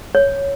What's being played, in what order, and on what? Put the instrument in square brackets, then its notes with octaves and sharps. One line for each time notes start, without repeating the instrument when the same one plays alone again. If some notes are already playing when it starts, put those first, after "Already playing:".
[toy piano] C#5